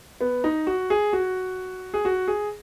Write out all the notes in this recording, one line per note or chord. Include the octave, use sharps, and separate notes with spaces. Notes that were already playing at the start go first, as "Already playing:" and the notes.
B3
D#4
F#4
G#4
F#4
G#4
F#4
G#4